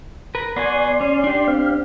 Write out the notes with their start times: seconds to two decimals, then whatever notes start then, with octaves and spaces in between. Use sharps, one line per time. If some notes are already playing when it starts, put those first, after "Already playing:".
0.35 A#4 B4
0.56 B3 F#4 D5 G#5 C6
1.01 C#4
1.24 D4 G4
1.48 C4 F5